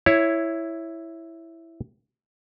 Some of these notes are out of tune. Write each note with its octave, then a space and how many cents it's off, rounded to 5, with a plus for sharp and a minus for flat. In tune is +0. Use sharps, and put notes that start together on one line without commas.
E4 +0 C#5 +0